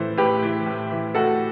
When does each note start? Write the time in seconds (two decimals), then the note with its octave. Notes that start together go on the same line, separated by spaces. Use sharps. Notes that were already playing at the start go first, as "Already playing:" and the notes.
Already playing: A2 E3 A4 C5
0.18 A2 G4 B4
0.42 E3
0.66 A2
0.91 E3
1.14 A2 F#4 A4